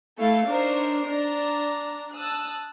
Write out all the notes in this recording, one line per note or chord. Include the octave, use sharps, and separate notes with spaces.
A3 E4 A4 F5
D4 D#4 A#4 C5 C#5
D4 A#5
A5 D#6 E6 F#6